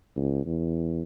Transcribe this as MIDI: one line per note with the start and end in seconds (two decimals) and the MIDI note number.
0.16 0.43 37
0.46 1.02 40